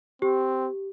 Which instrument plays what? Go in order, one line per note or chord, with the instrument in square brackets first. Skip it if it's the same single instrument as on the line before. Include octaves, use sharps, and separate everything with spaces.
[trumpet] C4 [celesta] G4